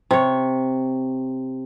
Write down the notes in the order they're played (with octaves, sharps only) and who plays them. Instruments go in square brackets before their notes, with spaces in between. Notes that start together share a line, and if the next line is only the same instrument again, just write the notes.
[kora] C3 C#5